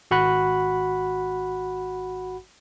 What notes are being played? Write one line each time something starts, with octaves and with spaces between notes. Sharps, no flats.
G#1 F#4 F#5 B5 F#6